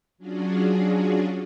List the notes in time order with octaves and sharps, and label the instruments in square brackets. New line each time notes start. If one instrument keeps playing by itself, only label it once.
[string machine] F#3 C#4 D4 F4 F#4 G#4